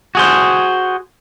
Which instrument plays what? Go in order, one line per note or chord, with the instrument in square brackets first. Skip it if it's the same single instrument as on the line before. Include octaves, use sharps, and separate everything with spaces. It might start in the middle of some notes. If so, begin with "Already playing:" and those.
[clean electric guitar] F#4 G#4 C5